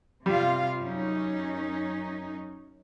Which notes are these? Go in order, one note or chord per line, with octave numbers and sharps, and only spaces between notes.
C3 G3 F4 F5
F#2 C#4 D#4